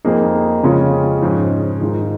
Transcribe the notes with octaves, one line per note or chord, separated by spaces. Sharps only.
F2 F3 A#3 D#4 G#4
F2 C#3 G#3 C#4 F4
G#2 F3 C#4 G#4
G#2 D#3 G#3 F4